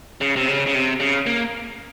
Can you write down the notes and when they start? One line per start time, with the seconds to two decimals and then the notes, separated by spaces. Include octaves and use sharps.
0.21 C#3
0.36 C3
0.48 C#3
0.67 C#3
0.74 C3
1.00 C#3
1.26 A#3